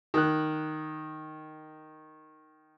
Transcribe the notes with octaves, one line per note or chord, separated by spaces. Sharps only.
D#3 F#6